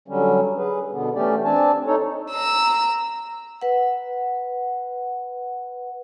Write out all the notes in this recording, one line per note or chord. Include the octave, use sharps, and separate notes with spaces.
D3 F#3 G3 C#4
G#4 B4
B2 D3 B3
E3 A3 C#4 G4 D5
C4 D4 D5 G#5 A5
D#4 A4 C#5
A#5 E6
B4 F#5